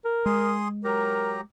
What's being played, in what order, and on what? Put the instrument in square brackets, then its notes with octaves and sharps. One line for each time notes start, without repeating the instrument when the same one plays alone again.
[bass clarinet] A#4
[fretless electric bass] G#3 [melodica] G#4 C6 D#6
[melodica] F#3 G4 A#5 [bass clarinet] A#4